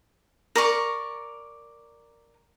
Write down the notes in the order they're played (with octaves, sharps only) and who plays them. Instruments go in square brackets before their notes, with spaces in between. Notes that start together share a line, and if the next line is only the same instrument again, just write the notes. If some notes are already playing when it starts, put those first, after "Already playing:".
[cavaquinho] A#4 D5 C#6